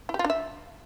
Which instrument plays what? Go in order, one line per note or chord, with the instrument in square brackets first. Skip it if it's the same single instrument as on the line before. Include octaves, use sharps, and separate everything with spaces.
[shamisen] E4
G4
F4
D4
E5